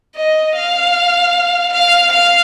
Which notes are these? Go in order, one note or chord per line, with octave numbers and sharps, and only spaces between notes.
D#5
F5
F5
F5